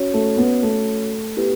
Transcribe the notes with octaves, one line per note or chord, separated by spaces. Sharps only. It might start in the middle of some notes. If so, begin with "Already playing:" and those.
Already playing: C#4 F#4 C#5
A3
B3
A3
B3 E4 G4 B4